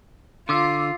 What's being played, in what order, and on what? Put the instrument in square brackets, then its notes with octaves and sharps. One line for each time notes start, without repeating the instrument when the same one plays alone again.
[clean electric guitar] D3 [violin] F4 [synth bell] C6 D6 E6